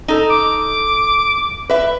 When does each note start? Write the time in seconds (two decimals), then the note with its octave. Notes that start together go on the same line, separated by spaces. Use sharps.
0.08 D#4 A4
0.30 D6
1.69 B4 E5